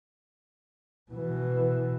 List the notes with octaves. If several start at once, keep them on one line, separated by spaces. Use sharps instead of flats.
B2 E3